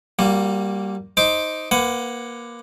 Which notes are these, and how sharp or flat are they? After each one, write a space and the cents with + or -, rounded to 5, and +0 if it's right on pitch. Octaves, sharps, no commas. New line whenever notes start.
G3 -5 A#3 -5 F#4 -40
D#4 +10 C5 +0 D6 +0
A#3 +15 B4 +30 F#5 +0